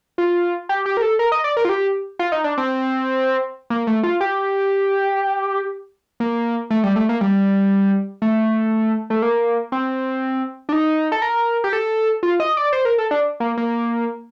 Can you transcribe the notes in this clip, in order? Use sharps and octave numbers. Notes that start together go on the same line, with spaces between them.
F4
G4
G4
A#4
A4
A#4
D#5
D5
A#4
F4
G4
F4
D#4
D4
C4
A#3
A3
F4
G4
A#3
A3
G3
A3
A#3
G3
A3
A3
A#3
C4
D4
D#4
A4
A#4
G4
A4
F4
D#5
D5
C5
A#4
A4
D4
A#3
A#3